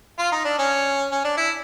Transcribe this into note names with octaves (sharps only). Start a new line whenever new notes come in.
F4
D#4
D4
C#4
C#4
D4
E4